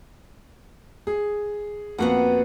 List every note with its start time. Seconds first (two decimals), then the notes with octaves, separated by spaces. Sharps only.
1.07 G#4
1.98 F2 A#3 B3 F#4 F#5